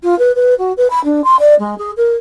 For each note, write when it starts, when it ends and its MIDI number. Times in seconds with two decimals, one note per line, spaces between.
0.03 0.17 65
0.18 0.31 71
0.35 0.54 71
0.58 0.72 66
0.77 0.87 71
0.90 1.02 83
1.04 1.23 62
1.24 1.36 84
1.39 1.55 74
1.59 1.75 56
1.78 1.91 68
1.97 2.15 70